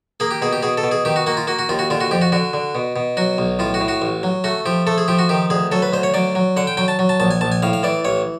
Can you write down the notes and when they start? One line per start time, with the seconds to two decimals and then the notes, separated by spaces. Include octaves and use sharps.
0.20 A#3 G#4
0.31 G4
0.42 B2 G#4
0.53 G4
0.63 B2 G#4
0.78 A4
0.83 B2
0.91 G#4
1.05 D#3 G4
1.16 F#4
1.27 A#3 F#4
1.37 F4
1.47 A#3 F#4
1.59 F#4
1.69 D#2 F4
1.79 F#4
1.90 D3 F4
2.00 F#4
2.11 F2 G4
2.21 F#4
2.32 D3 F#4
2.53 D3
2.75 B2
2.96 B2
3.17 F#3 F#4
3.38 B1
3.59 A2 F4
3.74 F#4
3.81 A2
3.88 F#4
4.02 A1
4.23 F#3
4.44 A3 F#4
4.66 F3 G4
4.87 A3 A4
4.98 G#4
5.08 F3 G4
5.19 F#4
5.29 D#3 G4
5.50 D2 G#4
5.72 F#3 A4
5.82 B4
5.93 D2 C5
6.03 C#5
6.14 F#3 D5
6.35 F#3
6.57 D3 F#5
6.67 G5
6.77 F#3 G5
6.88 A5
6.99 F#3
7.09 A5
7.20 A#1 A5
7.31 G#5
7.41 A#1 A5
7.52 G#5
7.62 A2 F5
7.73 F5
7.83 E3 D5
8.05 A1 C#5